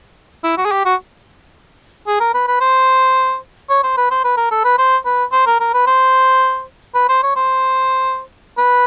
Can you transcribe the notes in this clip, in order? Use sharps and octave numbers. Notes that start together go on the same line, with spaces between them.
E4
F#4
G#4
G4
F#4
G#4
A#4
B4
B4
C5
C#5
C5
B4
C5
B4
A#4
A4
B4
C5
B4
C5
A#4
A#4
B4
C5
B4
C5
C#5
C5
B4